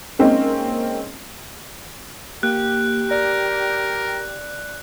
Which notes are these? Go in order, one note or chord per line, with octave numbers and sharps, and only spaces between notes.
G#3 A#3 C4 C#4 D#4
A#3 G4 F#6
A#4 D5